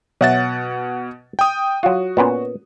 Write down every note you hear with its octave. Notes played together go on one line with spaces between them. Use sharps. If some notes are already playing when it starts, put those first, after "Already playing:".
B2 F#3 E5 F#5 A6
G5 D#6
F#3 F4 F#4
A#2 B3 C#4